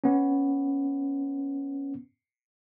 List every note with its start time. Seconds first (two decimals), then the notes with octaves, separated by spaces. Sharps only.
0.04 B3 C#4